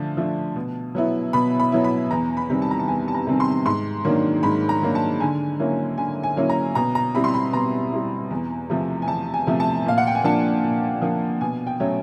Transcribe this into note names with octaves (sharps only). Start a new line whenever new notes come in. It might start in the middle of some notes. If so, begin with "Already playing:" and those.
Already playing: D3 F3 A3 D4 A5
F3 A3 D4
B2
F#3 B3 E4
B2 B5
B5
F#3 B3 E4
B5
E2 A#5
B5
C3 D#3 G3 C4
A5
A#5
A5
E2 G#5
A5
A#5
C3 D#3 G3 C4
C6
G#2 C6
D#3 F#3 A#3 D4
G#2 B5
A#5
D#3 F#3 A#3 D4
A5
D3 G#5
F#3 A#3 C#4 E4
D3 G#5
G#5
F#3 A#3 C#4 E4
A#5
B2 A#5
A#5
G3 C4 E4 B5
C6
B5
B2 A#5
G3 C4 E4
E2
C3 F3 A3
G#5
E2 A5
G#5
C3 F3 A3
A5
A#2 F5
F#5
G5
G#5
F3 A#3 D4 A5
A#2
F3 A#3 D4
B2 G#5
G5
F#3 A3 C#4